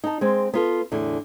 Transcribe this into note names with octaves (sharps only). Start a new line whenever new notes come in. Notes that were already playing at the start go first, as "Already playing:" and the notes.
D#4 A5
G#3 C4
B3 F4 A4
E2 A2 D3